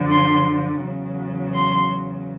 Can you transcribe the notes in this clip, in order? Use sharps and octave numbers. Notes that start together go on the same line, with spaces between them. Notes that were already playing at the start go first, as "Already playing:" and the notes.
Already playing: F#2 D3 F3
C6
E2 C#3 F#3
C6